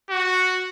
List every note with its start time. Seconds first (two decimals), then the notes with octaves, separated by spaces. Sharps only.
0.10 F#4